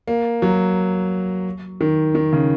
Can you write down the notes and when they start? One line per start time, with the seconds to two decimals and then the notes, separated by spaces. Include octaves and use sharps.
0.07 A#3
0.42 F#3
1.81 D#3
2.15 D#3
2.33 C#3